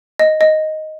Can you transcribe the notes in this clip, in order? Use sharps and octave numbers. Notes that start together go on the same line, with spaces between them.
D#5
D#5